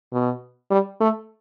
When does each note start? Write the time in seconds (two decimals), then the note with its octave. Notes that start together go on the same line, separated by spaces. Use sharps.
0.12 B2
0.70 G3
1.00 A3